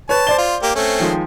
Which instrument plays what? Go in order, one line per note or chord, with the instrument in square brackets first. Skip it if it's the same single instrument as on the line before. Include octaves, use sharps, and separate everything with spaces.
[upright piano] B4 C#5 [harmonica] A5
[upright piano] C5 D5 G7
[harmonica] F4
A#3 G4
A3 C4 C#4
[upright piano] D#3 F3 G#3